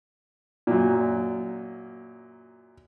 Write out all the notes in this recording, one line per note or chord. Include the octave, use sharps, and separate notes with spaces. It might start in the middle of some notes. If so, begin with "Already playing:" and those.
F#2 A#2